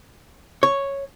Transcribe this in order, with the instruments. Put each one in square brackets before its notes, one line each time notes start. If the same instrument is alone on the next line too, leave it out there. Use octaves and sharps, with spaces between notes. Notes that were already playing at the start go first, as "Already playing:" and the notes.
[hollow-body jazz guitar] C#5